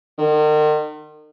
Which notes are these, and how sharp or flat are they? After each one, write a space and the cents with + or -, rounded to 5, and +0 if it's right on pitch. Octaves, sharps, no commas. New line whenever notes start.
D#3 -40